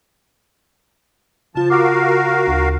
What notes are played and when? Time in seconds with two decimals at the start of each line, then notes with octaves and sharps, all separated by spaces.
1.55 C#3 F3 F4 A5
1.70 F#4 A#4 F5 D6
2.47 D2